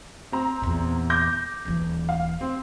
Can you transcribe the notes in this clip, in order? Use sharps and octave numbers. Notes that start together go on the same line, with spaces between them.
C4 A#5
E2 A#2
D6 G6 A#6
D#1 E3
F5
C4